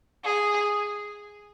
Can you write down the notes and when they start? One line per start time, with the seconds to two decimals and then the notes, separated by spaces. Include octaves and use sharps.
0.25 G#4